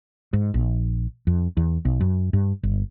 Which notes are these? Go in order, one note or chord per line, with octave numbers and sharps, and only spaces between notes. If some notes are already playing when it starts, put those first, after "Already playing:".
G#2
A#1
F2
E2
B1
F#2
G2
G1